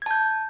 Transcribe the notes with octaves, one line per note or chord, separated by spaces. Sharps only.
A5 G6 G#6